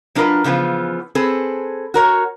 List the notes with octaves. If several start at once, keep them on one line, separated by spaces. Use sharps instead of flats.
F#3 D4 F4 A#4 B4 D#5
C#3 E3 F3 B3
C4 G#4 A4 B4
F#4 A#4 C#5